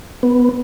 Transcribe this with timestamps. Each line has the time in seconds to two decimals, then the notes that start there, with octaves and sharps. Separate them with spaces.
0.23 B3